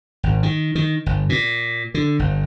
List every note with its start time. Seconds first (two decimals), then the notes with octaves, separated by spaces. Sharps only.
0.23 G#1
0.43 D#3
0.75 D#3
1.06 G1
1.29 A#2
1.94 D3
2.19 G1